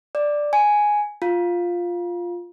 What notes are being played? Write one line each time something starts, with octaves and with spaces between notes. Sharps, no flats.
D5
G#5
F4